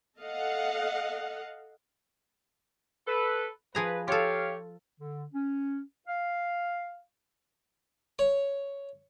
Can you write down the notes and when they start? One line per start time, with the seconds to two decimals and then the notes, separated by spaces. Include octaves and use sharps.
0.20 A4 D#5 F5 F#5
3.07 A4 B4
3.75 F3 G#4 B4 A#5
4.08 F4 G4 A4 C#5 F5
5.00 D3
5.33 C#4
6.08 F5
8.19 C#5